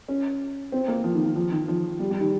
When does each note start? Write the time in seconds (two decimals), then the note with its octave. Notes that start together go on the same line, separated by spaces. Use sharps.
0.09 C#4
0.72 C4
0.88 A#3
1.04 F3
1.15 D#3
1.25 D#3
1.36 F3
1.52 D#3
1.68 F3
1.99 G3
2.10 G3
2.20 D#3